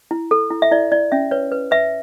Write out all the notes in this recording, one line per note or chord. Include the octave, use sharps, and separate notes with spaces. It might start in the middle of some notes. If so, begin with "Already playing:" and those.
E4
A4
E4
E5
E4 D5
E4 D5
C#4 E5
B4 C#5
B4
B4 E5